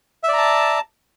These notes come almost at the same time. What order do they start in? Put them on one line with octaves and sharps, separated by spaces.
E5 D5 A#5 A5